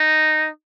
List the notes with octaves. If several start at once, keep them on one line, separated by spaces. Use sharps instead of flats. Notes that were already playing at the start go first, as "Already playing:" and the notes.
Already playing: D#4